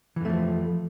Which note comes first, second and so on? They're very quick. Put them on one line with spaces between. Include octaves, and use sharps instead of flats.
E3 F2 A3 F3